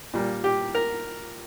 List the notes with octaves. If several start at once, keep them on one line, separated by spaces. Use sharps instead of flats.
A#2 G3 A#3
G4
A#4